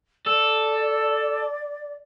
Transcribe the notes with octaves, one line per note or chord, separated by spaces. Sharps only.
A4 D5